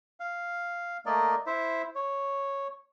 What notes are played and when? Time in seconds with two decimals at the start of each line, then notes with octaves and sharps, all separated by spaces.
0.20 F5
1.06 A3 A#3 A#4 D5 D#5
1.47 E4 C5 E5
1.96 C#5